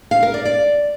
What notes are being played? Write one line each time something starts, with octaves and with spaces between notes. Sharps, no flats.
F5
A#4
D5
D5